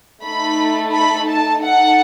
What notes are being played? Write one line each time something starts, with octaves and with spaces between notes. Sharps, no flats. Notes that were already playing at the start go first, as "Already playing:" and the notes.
A3 D#4 A4 B5
B5
A5
D#4 A4 F#5